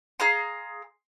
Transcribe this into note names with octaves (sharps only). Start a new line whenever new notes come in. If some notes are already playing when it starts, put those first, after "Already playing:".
G#4 F5 A#5 C6